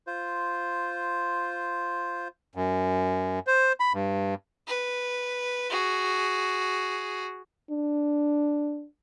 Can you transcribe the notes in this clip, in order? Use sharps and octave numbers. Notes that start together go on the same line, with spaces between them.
F4 C5
F#2
C5
B5
G2
B4
F#4 G#4
D4